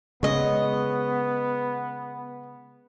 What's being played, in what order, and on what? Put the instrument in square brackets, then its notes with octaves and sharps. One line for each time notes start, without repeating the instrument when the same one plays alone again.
[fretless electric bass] C#3 G#3 [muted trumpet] B3 [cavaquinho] C#5 D#5